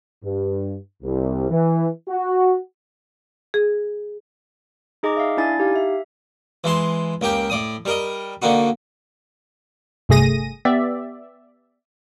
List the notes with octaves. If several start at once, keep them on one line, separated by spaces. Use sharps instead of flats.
G2
C2
E3
F#4
G#4
D#4 G#4 D#5 A#5 D6
E5 F5
D4 E4 D5 G#5 A6
D#4 G4 F5
E5
E3 G#3 A5 C6
C#2 A#3 G4 G5
A2 D5 D#6
G3 A#4 D#5
D3 A#3 D#4 F#4
G1 C2 A3 G#4 A#6 D#7
B3 G4 D5 E5